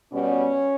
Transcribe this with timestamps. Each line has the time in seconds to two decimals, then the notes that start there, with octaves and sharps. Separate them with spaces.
0.13 B2 G3 B3 C#4